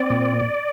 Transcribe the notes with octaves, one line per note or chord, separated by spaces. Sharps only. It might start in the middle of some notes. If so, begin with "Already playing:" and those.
Already playing: C4 D5
A#2